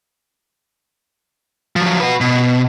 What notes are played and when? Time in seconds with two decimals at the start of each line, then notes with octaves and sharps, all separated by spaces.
1.76 F3 F#3
2.00 F#4 B4
2.21 B2